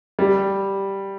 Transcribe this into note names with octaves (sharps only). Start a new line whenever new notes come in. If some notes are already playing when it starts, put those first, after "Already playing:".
G3